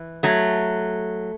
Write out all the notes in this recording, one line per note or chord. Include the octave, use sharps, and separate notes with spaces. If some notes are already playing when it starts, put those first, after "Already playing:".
Already playing: E3
F#3 A3